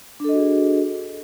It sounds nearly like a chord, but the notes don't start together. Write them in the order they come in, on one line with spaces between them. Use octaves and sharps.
D4 A4 D#5 F#4 G#4